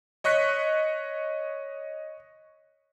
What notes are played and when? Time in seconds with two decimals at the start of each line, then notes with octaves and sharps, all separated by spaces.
0.24 C#5 D#5 C#6 F#6 B6 C#7